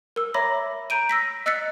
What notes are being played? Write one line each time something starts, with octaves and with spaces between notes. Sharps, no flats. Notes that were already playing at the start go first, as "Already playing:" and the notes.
A#4 E6
C#5 E5 A#5 B5 D6 A#6
A#5 G6 D7 D#7
E6 A#6 B6
D#5 E6 F#6 A6 B6 C#7